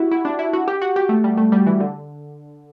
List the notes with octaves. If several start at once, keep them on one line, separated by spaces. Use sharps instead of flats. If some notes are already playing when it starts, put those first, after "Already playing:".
Already playing: E4 F#4 G4
E4
D4
E4
F#4
G4
F#4
G4
A3
G3
A3
G3
E3
D3